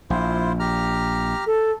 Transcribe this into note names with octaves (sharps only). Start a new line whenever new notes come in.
A#1 E4 F4 C5
G4 A#5 F6
A4